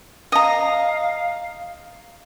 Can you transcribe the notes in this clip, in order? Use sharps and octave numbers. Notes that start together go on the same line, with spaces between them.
D#5 F5 A#5